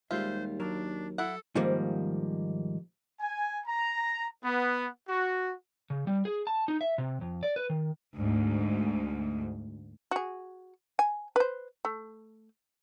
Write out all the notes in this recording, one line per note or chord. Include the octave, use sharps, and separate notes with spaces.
D#2 G3 G#3 F4 C5 E5
F#3 D4 A#4
E4 A4 F#5
G#2 D#3 F3 G3 A#3
G#5
A#5
B3
F#4
C#3
G3
G#4
A5
D#4
E5
C3
F2
D5
B4
D#3
D2 G#2
F#4 G#4
G#5
B4 C5
A3